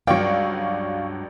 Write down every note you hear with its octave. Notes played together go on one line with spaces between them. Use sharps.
C#2 G2 F#3 D5 F5 G5 C#6